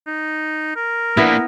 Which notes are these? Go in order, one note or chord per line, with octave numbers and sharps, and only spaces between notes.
D#4
A#4
A#3 B3 D4 E4